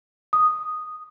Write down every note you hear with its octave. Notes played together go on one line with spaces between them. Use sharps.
D#6